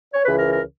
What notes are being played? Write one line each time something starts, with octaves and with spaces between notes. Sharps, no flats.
C#5
C#2 C#3 E3 B4
A#4
A#4